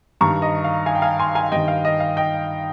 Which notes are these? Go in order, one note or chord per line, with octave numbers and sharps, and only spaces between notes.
G2 D#3 A#5 C#6
D#5
F5
F5 G#5
G5
F5 G#5
G#5 C6
F5 G#5
G2 D#3 D#5 G5
F5
D#5
F5
D#5 G5